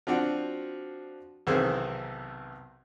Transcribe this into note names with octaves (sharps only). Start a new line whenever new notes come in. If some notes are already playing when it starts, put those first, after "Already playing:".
F3 C4 D4 F#4
B1 C3 D#3 E3 G#4 C5